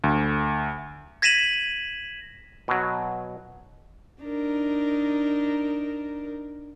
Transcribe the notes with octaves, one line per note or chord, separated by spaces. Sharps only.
D2
G#6 A#6 B6 D#7 E7 F#7
B2 F#3
D4 D#4 A#4